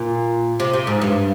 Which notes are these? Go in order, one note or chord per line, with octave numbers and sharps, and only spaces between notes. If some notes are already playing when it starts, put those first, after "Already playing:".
Already playing: A#2
C3
C3
G#2
G2